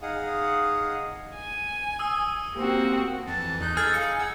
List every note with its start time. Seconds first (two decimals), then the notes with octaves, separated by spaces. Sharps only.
0.02 D#4 G#4 F5 F#5 D#6
1.35 G#5
1.99 D#6 E6
2.55 A#3 C4 F#4 G4
3.27 F2 E3 A5
3.61 E2 D#4 F#6 G6
3.77 G#4 A4 E6 F6 A6
3.94 F5 C#7
4.19 F#5 E6